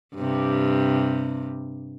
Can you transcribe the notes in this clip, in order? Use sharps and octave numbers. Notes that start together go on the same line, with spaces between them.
G2 C3